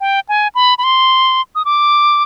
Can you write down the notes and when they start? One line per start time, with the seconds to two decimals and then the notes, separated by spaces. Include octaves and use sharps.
0.01 G5
0.29 G#5
0.55 B5
0.78 B5
0.84 C6
1.55 D#6
1.65 D6